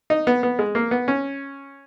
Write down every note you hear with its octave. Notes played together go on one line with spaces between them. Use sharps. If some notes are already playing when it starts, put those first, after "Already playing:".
D#4
B3
B3
G#3
A#3
B3
C#4